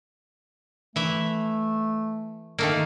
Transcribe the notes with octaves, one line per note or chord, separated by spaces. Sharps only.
E3 A3 E5
D#3 A3 A#3